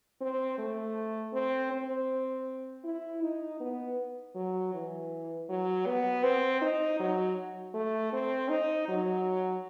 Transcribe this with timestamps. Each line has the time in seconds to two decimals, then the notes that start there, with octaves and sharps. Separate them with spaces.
0.21 C4
0.59 A3
1.33 C4
1.72 C4
2.84 E4
3.23 D#4
3.60 B3
4.35 F#3
4.74 E3
5.49 F#3
5.87 B3
6.24 C4
6.62 D#4
7.00 F#3
7.74 A3
8.13 C4
8.50 D#4
8.88 F#3